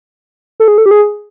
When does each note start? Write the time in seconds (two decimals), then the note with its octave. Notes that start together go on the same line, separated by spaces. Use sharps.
0.60 A4
0.68 G#4
0.78 A4
0.86 G4
0.91 G#4